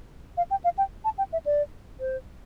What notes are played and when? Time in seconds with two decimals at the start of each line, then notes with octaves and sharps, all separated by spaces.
0.37 F5
0.51 G5
0.64 F5
0.78 G5
1.05 A5
1.18 G5
1.33 E5
1.46 D5
2.00 C5